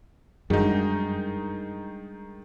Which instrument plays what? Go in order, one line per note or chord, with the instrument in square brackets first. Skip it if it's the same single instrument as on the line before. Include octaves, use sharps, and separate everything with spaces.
[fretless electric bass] F#2 [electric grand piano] D#3 D#4 [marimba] G3 G#3 D4 [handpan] G#4